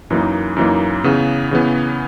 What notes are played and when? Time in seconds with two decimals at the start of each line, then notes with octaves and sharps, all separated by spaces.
0.10 F#2 E3 A#3 D#4
0.57 F#2 E3 A#3 D#4
1.04 C#3 E3 B3
1.51 C#3 E3 B3